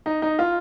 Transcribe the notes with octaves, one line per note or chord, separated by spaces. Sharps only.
D#4
D#4
F4